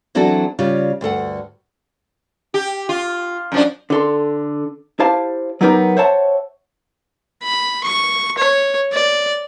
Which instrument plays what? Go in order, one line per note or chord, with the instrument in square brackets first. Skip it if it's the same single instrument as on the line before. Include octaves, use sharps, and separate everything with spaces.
[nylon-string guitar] E3 F#3 C4 D4 F#4 A4
C#3 G3 F4
D2 G2 A4 F#5
[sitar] G4
F4
F#2 F3 D4
[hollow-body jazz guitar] D3 A4 C6
E4 G4 C5 F5 A5
F#3 G3 B3 D#4 G4 A#4
C5 C#5 E5 F#5 A5
[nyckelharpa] B5
C#6
C#5
D5